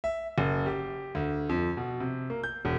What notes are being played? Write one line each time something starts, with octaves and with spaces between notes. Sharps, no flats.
E5
F#1
G4
D2
F2
B2
C3
A#3
G6
E1